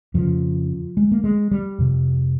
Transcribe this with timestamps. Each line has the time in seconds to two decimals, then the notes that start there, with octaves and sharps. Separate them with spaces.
0.14 F2 C#3 F3
0.97 G#3
1.12 A#3
1.24 G#3
1.51 G3
1.79 F2 C3